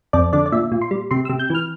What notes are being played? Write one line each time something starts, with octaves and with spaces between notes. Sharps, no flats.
F2 D5
D3 D5
D5
A#2 E5
A#2
C6
G3
C3 C6
C3 E6
G6
E3 F6